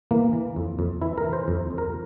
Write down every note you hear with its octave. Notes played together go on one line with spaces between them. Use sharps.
E3 A#3
E3
F2
F2
E3 E4
A#4
E3
C5
F2
F2
A#4